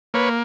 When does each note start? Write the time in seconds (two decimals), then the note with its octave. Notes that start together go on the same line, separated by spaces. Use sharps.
0.14 A#3 B4 C#5